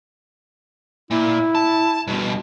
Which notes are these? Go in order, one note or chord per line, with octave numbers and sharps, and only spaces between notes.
A#2 E4
A5
G2 B2